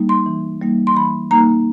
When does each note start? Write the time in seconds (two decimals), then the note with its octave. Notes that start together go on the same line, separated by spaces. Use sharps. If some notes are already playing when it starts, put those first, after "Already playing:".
Already playing: G3 A#3 D#4
0.09 C6
0.26 E3
0.61 G3 A#3 D#4
0.87 C6
0.96 E3 B5
1.31 G3 A#3 D#4 A#5